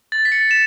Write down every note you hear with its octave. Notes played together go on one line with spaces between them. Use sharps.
A6
B6
C#7
E7